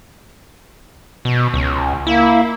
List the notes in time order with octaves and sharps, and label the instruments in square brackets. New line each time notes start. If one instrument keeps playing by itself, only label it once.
[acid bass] B2
C#2
[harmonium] A#3 [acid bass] E4